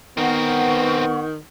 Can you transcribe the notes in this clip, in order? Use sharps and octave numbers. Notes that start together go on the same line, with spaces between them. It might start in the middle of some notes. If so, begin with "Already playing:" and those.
D#3 B3 C4 A#4 F#5 C#6